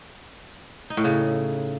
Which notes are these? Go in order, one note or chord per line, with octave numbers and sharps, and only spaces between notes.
D#4
A2
C#3